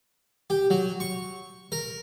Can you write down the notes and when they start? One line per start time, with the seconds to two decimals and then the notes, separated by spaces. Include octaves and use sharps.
0.50 G4
0.70 F#3
1.00 C#6
1.72 A#4